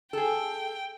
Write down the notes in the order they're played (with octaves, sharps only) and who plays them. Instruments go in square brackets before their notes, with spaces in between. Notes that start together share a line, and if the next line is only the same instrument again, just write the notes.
[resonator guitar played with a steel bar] G#4 A4 [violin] G5